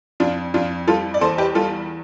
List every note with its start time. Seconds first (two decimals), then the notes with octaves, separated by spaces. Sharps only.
0.20 F2 D4 F4
0.54 F2 D4 F4
0.87 G3 F4 A4
1.14 D5
1.21 E2 A4 C5
1.38 G4 B4
1.55 G3 F4 A4